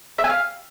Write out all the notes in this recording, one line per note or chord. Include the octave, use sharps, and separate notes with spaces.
E5
G#5
F5